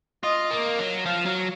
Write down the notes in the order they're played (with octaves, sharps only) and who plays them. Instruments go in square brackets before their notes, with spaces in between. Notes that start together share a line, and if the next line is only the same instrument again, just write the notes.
[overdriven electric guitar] F4 [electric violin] D#5
[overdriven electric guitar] A#3
F#3
[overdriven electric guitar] F3 [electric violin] F5
[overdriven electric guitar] F#3